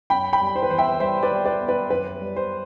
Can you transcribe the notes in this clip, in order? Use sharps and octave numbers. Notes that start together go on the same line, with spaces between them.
F#2 G5 B5
G5 B5
G3
C5
B4
E3 C5
E5 G5
G3 C5 E5
B4 D5
G3
B4 D5
B3
B4 D5
F#2 B4
G3
C5